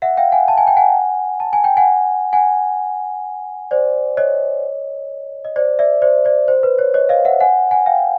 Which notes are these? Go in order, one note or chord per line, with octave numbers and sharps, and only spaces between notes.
E5 F#5
F5 G5
F#5 G#5
A5
G#5
G5
F#5 G#5
A5
G#5
G5
F#5 G#5
F#5 G#5
C5 D5
C#5 D#5
D#5
C5 D5
D5 E5
C5 D5
C5 D5
C5
B4
C#5
C#5 D#5
D#5 F5
E5 F#5
F#5 G#5
F#5 G#5
F5 G5